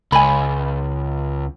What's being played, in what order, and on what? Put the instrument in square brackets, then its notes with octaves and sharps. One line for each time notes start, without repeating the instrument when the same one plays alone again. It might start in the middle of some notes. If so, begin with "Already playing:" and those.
[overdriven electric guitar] C#2 [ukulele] G#5 B5